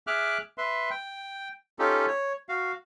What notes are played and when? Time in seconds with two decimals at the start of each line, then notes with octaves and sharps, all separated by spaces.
0.07 G#4 E5 D6 F6 F#6
0.58 B4 E5 C6
0.90 G5
1.79 C#4 D#4 F4 G4 A4
2.07 C#5
2.49 F#4 F5